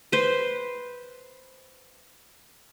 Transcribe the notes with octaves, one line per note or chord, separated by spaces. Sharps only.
B4 C5